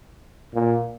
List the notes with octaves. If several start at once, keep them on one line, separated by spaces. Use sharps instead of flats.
A#2